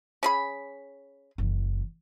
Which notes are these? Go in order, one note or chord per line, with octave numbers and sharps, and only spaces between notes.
C#4 G#4 B5
F#1 E3